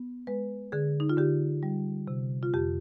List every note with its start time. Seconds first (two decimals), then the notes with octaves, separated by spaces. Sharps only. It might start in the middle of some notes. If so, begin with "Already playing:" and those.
Already playing: B3
0.27 G#3 B4
0.72 D3 G#4
1.00 D#4
1.10 F4
1.17 D3 G4
1.63 G3
2.07 C3
2.43 F4
2.54 F2 G4